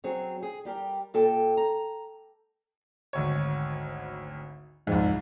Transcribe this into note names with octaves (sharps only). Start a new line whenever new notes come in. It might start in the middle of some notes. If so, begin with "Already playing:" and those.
F#3 C4 G#4 C#5
G#4
G3 G4 A#4
A#2 A4 G5
A#5
G#1 D2 C#5
C2 F2 G#2